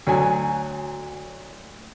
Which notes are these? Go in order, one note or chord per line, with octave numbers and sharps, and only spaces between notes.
D2 F#3 G#5